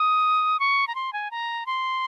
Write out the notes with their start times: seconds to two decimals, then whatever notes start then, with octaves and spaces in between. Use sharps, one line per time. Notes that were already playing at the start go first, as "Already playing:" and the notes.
Already playing: D#6
0.60 C#6
0.87 A#5
0.95 C6
1.13 G#5
1.31 A#5
1.66 C6